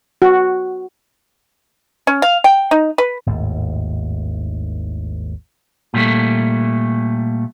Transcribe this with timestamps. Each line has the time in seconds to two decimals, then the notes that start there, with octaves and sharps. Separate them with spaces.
0.22 F#4
2.07 C#4
2.22 F5
2.44 G5
2.71 D#4
2.98 B4
3.26 G#1 D#2 A2
5.94 A#2 G3 A3